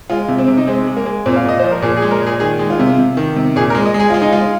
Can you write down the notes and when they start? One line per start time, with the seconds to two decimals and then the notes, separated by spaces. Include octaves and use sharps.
0.10 G#3 F4
0.28 C3
0.39 C4
0.48 C3
0.57 D#4
0.67 G#3 C4
0.87 G#3
0.97 A#3
1.06 G#3
1.26 A#2 C4
1.36 F5
1.45 A#2 D#5
1.59 C5
1.64 F3
1.71 A#4
1.82 A#2 G#4
1.97 G#4
2.02 G#3
2.11 A#4
2.22 A#2 G#4
2.40 D#3 G#4
2.59 G#3
2.70 F4
2.79 C3
2.99 C3
3.17 D#3
3.36 C3
3.56 A#2 G#4
3.70 A#4
3.75 G#3
3.85 D#5
3.94 G#3
4.00 G#4
4.10 G#3 F4
4.22 D#4
4.32 G#3 F4